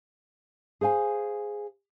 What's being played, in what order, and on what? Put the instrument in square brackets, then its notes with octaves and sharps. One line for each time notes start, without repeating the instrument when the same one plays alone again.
[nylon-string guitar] G#4 C5 F5 G#5